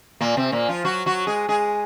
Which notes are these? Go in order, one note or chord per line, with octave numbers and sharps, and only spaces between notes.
A#2 A#3
C3 C4
A#2 A#3
F3 F4
F#3 F#4
F#3 F#4
G#3 G#4
G#3 G#4